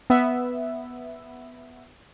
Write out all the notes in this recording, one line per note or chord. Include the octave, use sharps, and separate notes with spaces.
B3 E5